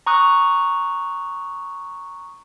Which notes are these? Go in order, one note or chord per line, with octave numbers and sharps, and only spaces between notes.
A#5 C#6 D#6 F#6